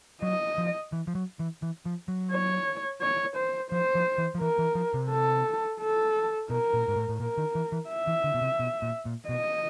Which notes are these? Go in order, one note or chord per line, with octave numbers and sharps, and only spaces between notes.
F#3 D#5
F3
E3
F3
F#3
E3
E3
F3
F#3
C#5
C#5
C5
F3 C5
F3
E3
F3
E3 A#4
E3
F3
C3
A4
A4
B2 A#4
A#2
G#2
A2
A2
A#2 A#4
D#3
E3
E3
E5
E3
D3
B2
C3
B2
A#2
A#2
B2 D#5